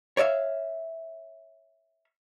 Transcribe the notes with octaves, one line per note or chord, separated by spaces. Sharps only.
C#5 D5 E5 F5